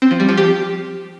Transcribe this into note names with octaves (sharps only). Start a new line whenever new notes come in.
C4
F3
G3
F3
G4